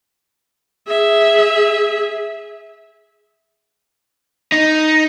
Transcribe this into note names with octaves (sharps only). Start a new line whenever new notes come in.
G#4 E5
D#4